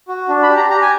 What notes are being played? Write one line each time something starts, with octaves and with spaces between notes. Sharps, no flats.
F#4
D4
B5
G4
A#5
G4 A#5
G#5